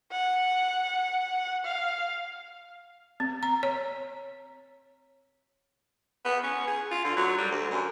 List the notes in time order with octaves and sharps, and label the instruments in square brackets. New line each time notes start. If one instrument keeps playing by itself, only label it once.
[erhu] F#5
F5
[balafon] C4
A#5
C#5
[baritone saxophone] B3
C#4
G#4
F4
D3
F#3
G3
D2
F#2